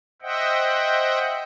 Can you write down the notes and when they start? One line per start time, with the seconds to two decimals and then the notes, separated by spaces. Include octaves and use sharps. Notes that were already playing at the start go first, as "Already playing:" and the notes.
0.22 C5 D#5 E5 F#5 G5